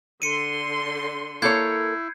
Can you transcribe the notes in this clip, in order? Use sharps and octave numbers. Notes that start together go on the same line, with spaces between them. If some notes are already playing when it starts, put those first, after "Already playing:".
D3 C6 C#7 D#7
A#3 E4 A4 C#5 G6 G#6 C7